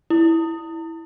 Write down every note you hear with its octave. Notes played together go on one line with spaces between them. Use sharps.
E4